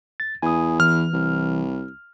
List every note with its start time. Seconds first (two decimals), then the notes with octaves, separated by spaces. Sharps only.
0.20 A6
0.42 E2 G#5 D#6
0.80 E3 F6
1.13 C2